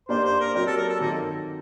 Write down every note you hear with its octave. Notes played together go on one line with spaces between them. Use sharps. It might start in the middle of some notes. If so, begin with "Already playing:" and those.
A#3 D4 G4 C5 D5
C5
A#4
F#3 C4 G4 A#4 D5
A4
A#4
A4
D#3 F#3 A#3 C4 D#4 A4